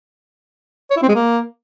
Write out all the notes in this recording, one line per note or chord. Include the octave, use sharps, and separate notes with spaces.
C#5
E4
C4
G#3
A#3